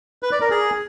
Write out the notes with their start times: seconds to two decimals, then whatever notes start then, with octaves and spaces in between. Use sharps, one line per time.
0.23 B4
0.32 D5
0.41 A#4
0.51 G#4